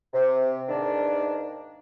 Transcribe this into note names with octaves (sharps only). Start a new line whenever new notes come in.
C3
E2 G#2 D#3 A#3 D4